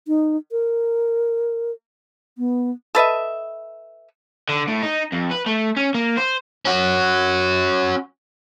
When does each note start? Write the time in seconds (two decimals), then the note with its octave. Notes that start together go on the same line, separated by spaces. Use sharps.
0.08 D#4
0.52 A#4
2.38 B3
2.95 A4 B4 D#5 E5
4.49 D3
4.68 A2
4.83 D#4
5.13 F2
5.31 B4
5.47 A3
5.77 C#4
5.94 A#3
6.17 C5
6.65 C#4 F#4